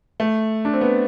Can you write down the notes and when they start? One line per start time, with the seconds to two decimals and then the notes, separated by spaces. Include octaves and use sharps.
0.20 A3
0.65 D4
0.74 C4
0.81 B3